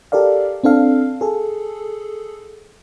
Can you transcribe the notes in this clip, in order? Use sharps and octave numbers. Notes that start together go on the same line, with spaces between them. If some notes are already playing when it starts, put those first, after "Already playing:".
G4 A4 A#4 D5 F5
C4 D4 A4 F5
G#4 A4